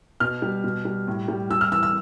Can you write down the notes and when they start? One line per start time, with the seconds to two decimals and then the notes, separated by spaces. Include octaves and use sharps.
0.20 B2 F6
0.42 G3
0.64 B2
0.85 G3
1.08 A2
1.28 G3
1.50 G3 E6
1.61 F6
1.72 E3 E6
1.83 E6